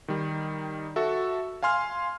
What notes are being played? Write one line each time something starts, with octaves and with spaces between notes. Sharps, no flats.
D#3 G3
F#4 A4 E5
F5 G#5 C6 F6